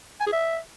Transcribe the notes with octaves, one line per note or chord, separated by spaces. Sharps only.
G#5
G#4
E5